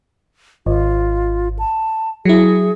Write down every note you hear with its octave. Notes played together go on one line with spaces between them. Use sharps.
G#1 F4
A5
F#3 E4 G#4